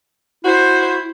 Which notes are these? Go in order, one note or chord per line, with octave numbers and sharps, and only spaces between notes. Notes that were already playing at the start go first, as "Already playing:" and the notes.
E4 F#4 C5